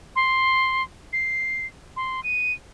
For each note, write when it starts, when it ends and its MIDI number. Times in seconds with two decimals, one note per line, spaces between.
0.16 0.83 84
1.13 1.66 96
1.96 2.23 84
2.23 2.53 99